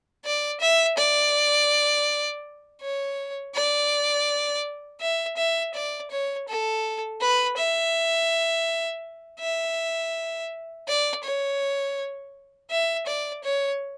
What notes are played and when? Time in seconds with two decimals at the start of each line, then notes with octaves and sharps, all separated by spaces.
0.25 D5
0.60 E5
0.97 D5
2.81 C#5
3.55 D5
5.00 E5
5.37 E5
5.74 D5
6.10 C#5
6.48 A4
7.20 B4
7.57 E5
9.40 E5
10.87 D5
11.23 C#5
12.70 E5
13.06 D5
13.43 C#5